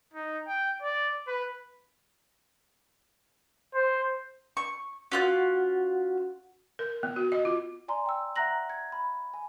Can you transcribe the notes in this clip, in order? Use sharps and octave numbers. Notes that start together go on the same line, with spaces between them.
D#4
G5
D5
B4
C5
C#6
C#4 F4 F#4 F#5 F#6
A#4
B3
F#4
D#5
F4
D5 G#5 A#5 C6
G5 E6
E5 F#5 A#5 F#6 A#6 F#7
G#6
B5
G#5